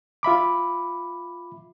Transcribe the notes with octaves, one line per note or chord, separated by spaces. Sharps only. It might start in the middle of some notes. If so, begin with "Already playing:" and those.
F4 E5 B5 D6